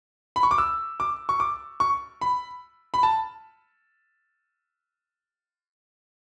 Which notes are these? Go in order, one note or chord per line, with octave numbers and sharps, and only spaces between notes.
B5
C#6
D6
E6
D6
C#6
D6
C#6
B5
B5
A5